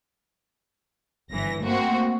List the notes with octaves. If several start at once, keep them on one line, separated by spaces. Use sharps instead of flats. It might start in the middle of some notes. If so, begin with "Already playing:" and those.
G1 E3 A#6
A3 A#3 C4 F#4